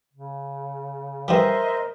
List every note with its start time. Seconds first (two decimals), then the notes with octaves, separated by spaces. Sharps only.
0.13 C#3
1.28 E3 F3 G3 A#4 C5 D#5 E5